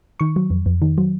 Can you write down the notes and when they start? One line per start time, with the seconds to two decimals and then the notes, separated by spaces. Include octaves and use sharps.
0.20 D#3 C#6
0.36 F#3
0.50 F2
0.66 F2
0.82 D#3
0.98 F#3